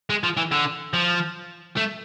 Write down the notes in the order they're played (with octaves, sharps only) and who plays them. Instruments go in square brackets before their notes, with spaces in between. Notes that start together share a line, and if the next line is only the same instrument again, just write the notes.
[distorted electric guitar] G#3
F3
E3
D3
F3
A3